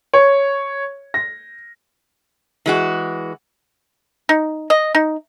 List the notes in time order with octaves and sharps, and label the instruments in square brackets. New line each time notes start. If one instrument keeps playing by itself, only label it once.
[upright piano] C#5
A#6
[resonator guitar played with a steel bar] E3 G#3 F#4
[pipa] D#4
D#5
D#4